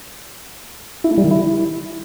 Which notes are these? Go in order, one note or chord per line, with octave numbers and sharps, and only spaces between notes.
E4
A3
G3
D#3
E4